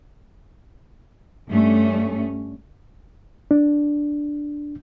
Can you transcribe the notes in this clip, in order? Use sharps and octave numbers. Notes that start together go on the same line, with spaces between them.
G2 A3 C#4
D4